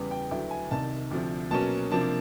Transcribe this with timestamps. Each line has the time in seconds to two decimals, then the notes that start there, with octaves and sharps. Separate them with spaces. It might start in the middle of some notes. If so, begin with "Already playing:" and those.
Already playing: E2 C#3 E3 G3 B3
0.11 G5
0.31 D2 D3 F#3 B3 E4 G5
0.51 G#5
0.71 C2 C3 D#3 A5
1.11 D2 C3 F3
1.51 B2 F#3 A#3 C#4 A5
1.91 C3 F3 A#3 D4 A5